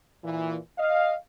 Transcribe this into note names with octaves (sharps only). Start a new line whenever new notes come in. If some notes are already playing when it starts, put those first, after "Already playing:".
A#2 E3
D#5 F5